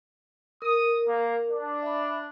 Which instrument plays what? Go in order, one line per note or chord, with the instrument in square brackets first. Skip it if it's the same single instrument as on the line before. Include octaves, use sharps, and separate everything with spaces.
[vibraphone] A#4 [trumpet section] D#6
[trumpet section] A#3
D4
[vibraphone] E5 B5